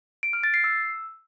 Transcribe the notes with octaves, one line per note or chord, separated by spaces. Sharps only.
D7
F6
A6
C7
E6